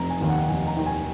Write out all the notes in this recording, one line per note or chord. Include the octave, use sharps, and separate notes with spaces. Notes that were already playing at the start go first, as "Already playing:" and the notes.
Already playing: F1 A#5
G#5
D#2 D#3
F#5
F1 G#5
A#5
D#2 D#3
G#5